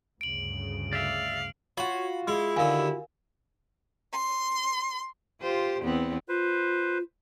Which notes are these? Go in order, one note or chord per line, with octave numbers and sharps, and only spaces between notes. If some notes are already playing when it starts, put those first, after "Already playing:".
D2 G2 C#3 D7 F#7
D5 E5 F5
F4 F#4 C#5 B5
G#3 E4
D#2 D3 A#4 F5 G#5
C6
F4 G4 C5
E2 B3 C4
F4 B4 C5